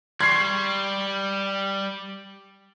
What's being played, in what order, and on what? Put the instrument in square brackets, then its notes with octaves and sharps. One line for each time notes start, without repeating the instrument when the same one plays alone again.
[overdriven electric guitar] G3 [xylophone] C6 C#6 [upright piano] G#6 C7